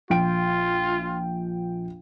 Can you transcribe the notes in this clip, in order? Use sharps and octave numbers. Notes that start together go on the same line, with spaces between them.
A#1 F4 G5 D7